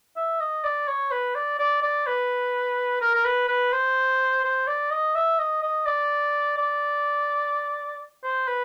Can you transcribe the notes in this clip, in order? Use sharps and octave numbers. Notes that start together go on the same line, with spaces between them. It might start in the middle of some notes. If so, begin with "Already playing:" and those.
E5
D#5
D5
C#5
B4
D5
D5
D5
B4
A#4
A#4
B4
B4
C5
C5
D5
D#5
E5
D#5
D#5
D5
D5
C5
B4